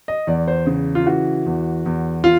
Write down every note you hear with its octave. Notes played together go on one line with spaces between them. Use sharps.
D#5
E2 D5
C5
C#3
F4
E3 F#4
E2
E2
F4